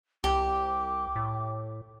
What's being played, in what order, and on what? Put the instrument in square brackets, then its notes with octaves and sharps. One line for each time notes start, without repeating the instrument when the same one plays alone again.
[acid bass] C2 [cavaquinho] G4 [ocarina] D6
[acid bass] A2